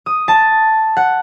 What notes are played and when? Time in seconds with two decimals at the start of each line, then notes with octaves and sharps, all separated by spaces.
0.06 D#6
0.28 A5
0.97 F#5